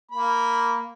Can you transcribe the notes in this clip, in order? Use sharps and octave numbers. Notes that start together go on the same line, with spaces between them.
A#3 B5